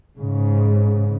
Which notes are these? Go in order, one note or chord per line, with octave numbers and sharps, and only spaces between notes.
G#2 C#3